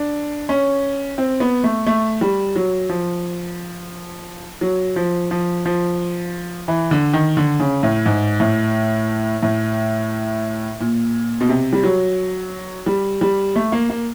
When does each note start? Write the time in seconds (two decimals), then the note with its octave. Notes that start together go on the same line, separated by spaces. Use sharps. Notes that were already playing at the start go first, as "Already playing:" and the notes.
Already playing: D4
0.49 C#4
1.18 C4
1.40 B3
1.64 A3
1.87 A3
2.21 G3
2.56 F#3
2.89 F3
4.61 F#3
4.96 F3
5.31 F3
5.65 F3
6.68 E3
6.91 D3
7.13 D#3
7.37 D3
7.60 C#3
7.83 A2
8.06 G#2
8.40 A2
9.43 A2
10.80 A#2
11.41 B2
11.49 C3
11.73 G3
11.83 F#3
12.86 G3
13.21 G3
13.56 A3
13.72 A#3
13.90 A#3